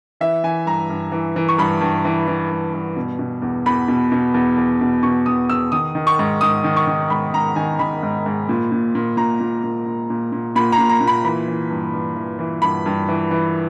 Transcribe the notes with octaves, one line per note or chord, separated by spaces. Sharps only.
E3 E5
E3 G#5
G2 A#5
G2
E3
E3
C#6
G2 B5
G2
E3
E3
G2
G2
B2
B2
E2
E2 B5
B2
B2
E2
E2
B2
B2 C#6
E2 D#6
E2 E6
D#3 D#6
D#3
C#6
G#2
G#2 D#6
D#3
C#6
D#3
G#2 B5
G#2 A#5
D#3 G#5
D#3 B5
G#2
G#2
A#2
A#2
A#2
A#2 A#5
A#2
A#2
A#2
A#2
A#2
A#2 B5
A#5
A#2
A#5
A#2
B5
E3 B5
E3
G2
G2
E3
E3
G2 B5
G2
E3
E3